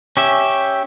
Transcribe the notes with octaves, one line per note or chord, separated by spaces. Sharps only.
C#4 G4 E5